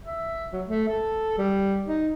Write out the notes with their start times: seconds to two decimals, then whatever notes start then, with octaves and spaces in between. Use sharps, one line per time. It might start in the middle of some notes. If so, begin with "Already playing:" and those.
0.05 E5
0.53 F#3
0.68 A3
0.89 A4
1.38 G3
1.88 D#4